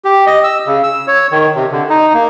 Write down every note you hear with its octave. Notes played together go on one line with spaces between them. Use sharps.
G4
D#5
E6
C#3
E6
C#5
D#3
C3
D3
D#4
A#3